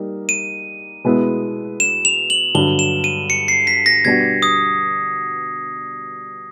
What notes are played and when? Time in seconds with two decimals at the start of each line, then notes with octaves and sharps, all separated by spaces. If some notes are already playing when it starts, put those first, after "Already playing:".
Already playing: G3 A#3 D#4
0.29 D#7
1.04 B2 G#3 B3 E4
1.80 E7
2.05 F7
2.30 F#7
2.55 G2 D3 F#3 G7
2.79 E7
3.04 D#7
3.30 C#7
3.48 C7
3.67 B6
3.86 A#6
4.05 B2 G3 B3 D4 F#4 G#6
4.42 D#6